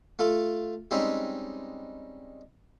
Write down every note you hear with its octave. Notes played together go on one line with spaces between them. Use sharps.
A3 F4 A4
G3 G#3 C4 C#4 D#4 E5